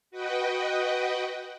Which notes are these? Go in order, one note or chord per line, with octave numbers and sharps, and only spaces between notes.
F#4 B4 D#5 F#5 G5